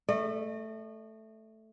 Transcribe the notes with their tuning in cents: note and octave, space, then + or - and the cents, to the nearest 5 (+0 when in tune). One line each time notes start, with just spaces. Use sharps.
A3 +0 D#5 -40